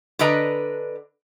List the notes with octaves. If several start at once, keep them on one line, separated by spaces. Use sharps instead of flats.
D3 D4 B4 D#5 A#5